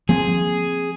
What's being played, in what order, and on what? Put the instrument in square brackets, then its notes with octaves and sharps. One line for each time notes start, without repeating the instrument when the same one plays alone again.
[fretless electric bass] F3 A#3 C4 [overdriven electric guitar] G#4